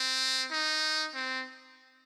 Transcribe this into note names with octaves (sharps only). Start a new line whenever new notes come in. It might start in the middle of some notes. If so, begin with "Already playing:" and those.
Already playing: C4
D#4
C4